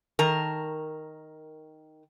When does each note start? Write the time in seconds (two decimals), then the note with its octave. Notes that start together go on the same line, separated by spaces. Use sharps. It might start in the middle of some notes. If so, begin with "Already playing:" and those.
0.19 D#3 A#4 A5